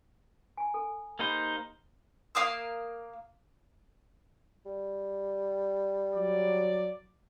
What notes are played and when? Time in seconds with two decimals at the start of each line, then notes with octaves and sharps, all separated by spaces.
0.57 G#5 A#5
0.74 A4 G#5
1.19 A#3 D#4 G4 C5 F#5 B5
2.35 A#3 F5 D#6 E6
4.66 G3
6.14 F#3 D5